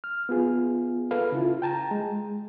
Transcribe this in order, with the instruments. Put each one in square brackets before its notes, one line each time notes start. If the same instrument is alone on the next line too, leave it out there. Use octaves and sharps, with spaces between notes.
[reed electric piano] F6
B3 F4 G#4
A4 B4 F5
C#3 E4 F4
G5 A5 A#5
G#3